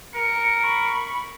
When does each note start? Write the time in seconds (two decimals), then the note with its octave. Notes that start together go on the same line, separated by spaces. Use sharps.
0.15 A#4 C#7
0.65 B5 C#6